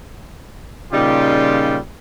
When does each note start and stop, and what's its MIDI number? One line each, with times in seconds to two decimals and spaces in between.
0.92 1.76 46
0.92 1.76 49
0.92 1.76 55
0.92 1.76 63
0.92 1.76 65
0.92 1.76 67